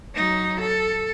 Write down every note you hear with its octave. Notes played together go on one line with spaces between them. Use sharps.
F#3 D#4
A4